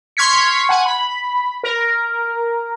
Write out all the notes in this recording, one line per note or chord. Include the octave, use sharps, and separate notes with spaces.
C6 C#6 F6 G#6 B6 C#7
F#5 G#5
B5
A#4